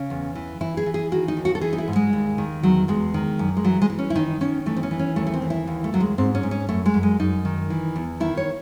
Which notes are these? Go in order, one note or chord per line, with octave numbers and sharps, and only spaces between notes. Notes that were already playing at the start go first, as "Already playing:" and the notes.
Already playing: C#3 C#4
E2
E3
E3 E4
G#4
E3
G#4
D#3 F#4
D#4
D#2
F#4
A4
E3 G#4
D#4
E4
G#2
G#3
D#2
D#3
E2 F#3
E2 G#3
D#3
F#2
G#3
E3 F#3
G#3
E3
C#4
E4
D#3 D#4
D#3 C#4
E3 A3
C4
C#4
E3
C#4
D#2 A3
A3
C4
E3
E4
D#2
A3
D#2 F#3
G#3
G#2 C4
C#4
G#2
C#4
F#2 A3
G#3
F#2
G#3
F#2 D#4
D#3
E3
E2
D#3 E4
C#5